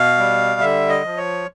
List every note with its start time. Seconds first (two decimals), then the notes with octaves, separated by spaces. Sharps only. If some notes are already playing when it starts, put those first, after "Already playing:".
Already playing: B2 F5
0.18 G3
0.61 D3 E5
0.89 D#5
1.04 F3
1.17 C#5